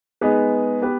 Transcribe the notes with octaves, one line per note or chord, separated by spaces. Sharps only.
G#3 B3 D#4 G#4 B4
B3 G4 B4